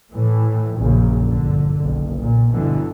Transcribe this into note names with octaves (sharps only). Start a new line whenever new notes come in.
A2 E3
A#1 F#2 C#3
G1 D3
F#1 B1
A#2
G1 B2 D3 E3